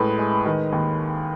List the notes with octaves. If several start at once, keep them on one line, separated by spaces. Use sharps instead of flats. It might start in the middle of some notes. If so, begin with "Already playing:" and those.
Already playing: A2 G#3 B4
G#3
D#3
D#2